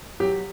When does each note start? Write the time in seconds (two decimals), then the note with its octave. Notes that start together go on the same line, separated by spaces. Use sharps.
0.20 F#3 G4